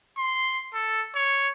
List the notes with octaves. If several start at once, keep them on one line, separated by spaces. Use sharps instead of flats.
C6
A4
C#5